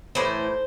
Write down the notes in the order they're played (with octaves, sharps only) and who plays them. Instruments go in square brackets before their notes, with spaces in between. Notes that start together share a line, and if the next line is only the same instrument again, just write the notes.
[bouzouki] A2 E3 C5